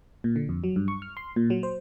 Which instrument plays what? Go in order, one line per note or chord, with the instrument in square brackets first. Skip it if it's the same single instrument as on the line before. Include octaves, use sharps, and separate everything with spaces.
[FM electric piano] A#2
D3
F2
F#3
G2
C#6
F6
C6
A#2
F#3
C5